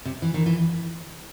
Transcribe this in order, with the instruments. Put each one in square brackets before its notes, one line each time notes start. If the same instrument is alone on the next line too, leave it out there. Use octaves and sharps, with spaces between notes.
[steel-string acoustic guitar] C3
E3
D#3
E3